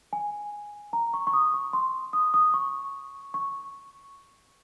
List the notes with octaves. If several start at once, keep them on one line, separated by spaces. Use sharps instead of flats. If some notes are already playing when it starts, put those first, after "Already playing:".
G#5
A#5
C#6
C#6
D#6
C#6
C6
D#6
D#6
C#6
C#6